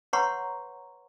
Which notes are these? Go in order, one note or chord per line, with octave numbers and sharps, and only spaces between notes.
B4 C#5 F#5 A#5 C6 C#6